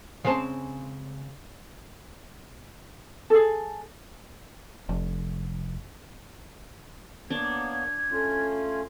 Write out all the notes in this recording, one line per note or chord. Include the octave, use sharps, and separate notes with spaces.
C#3 G#3 C4 A5
G#4 A4
F1
A#3 B3 D4 C#5 G#6
A3 C#4 F4